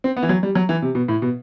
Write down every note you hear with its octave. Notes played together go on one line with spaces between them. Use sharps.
C4
B3
E3
F#3
G3
F#3
E3
C3
B2
A2
B2